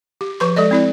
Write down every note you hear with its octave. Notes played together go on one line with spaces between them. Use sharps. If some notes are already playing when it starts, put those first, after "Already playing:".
G4
F3 B4 C6 C#6
G#3 A4 D5 D#5
C4 E4 D5